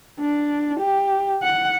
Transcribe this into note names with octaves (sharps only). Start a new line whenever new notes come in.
D4
G4
F#5